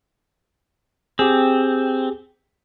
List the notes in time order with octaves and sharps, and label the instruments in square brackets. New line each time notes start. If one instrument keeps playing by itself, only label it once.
[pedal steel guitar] C4 [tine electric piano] G4 G#4